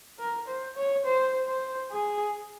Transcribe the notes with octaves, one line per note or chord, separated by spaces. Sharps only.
A#4
C5
C#5
C5
C5
G#4